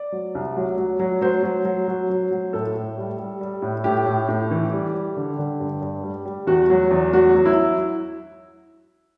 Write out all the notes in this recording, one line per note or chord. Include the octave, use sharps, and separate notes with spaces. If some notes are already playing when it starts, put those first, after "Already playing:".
Already playing: D5
F#3
C2
F#3
F#3
F#3
F#3 C5
F#3
F#3
F#3
F#3
F#3
A2 A4
A2
G3
G3
G3
A2
A2 G4
A2
A2
E3
G3
G3
D3
D3
G2
G2
G3
G3
E2 F#4
F#3
E2
F#3 F#4
F#3
E4